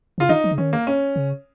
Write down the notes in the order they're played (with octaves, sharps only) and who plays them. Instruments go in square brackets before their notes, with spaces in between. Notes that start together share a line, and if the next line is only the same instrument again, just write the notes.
[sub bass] C#3 [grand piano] F4
[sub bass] D#3 [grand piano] D#4
[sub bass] F3
C#3
[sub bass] D#3 [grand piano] C#4
[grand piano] A#3
C#4
[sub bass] C#3